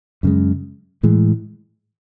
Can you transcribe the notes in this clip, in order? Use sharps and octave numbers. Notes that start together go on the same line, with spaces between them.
F#2 C#3 G#3
A2 E3 G#3